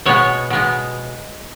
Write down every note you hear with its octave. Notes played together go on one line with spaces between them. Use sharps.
B2 G#3 B3 C#5
B2 G#3 B3